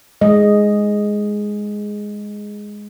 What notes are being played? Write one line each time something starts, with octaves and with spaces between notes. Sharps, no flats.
G#3 D#5